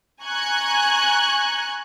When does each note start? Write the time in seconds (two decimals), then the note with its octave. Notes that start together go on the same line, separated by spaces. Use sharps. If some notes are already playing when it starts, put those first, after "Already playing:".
0.22 G#5 A#5 C#6 F#6 G#6